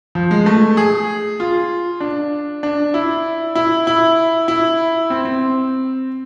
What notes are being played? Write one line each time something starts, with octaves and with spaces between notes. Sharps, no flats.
F3
G#3
A3
G#4
F4
D4
D4
E4
E4
E4
E4
C4
C4